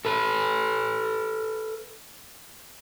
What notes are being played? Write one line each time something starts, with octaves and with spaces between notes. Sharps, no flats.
A4 B4